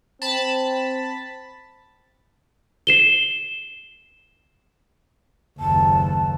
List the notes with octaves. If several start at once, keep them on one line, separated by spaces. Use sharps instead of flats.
C4 A5 B5
C7 E7 G7
F#1 D#2 A5